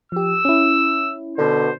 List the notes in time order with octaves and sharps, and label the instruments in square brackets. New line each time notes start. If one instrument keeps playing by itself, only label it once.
[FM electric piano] F3 G4 [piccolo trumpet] E6
[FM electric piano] C#4 E4
[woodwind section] B2 D3 [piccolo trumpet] C5